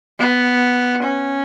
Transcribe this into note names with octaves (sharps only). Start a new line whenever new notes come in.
B3
C#4